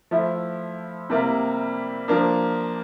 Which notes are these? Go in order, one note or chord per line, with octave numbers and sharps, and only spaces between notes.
F3 A3 E4
C3 G3 A#3 E4
F3 A#3 D4